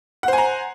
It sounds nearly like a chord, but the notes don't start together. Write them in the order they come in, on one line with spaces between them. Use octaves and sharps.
F#5 C5 G#5 A#5